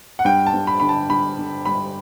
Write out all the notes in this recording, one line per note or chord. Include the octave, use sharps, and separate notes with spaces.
F#5
G2 G5
A5
G2
B5
D3 B5
A5
G2 B5
D3
G2 B5